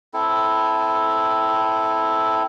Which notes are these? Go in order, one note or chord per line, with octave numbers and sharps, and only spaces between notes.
C4 E4 A4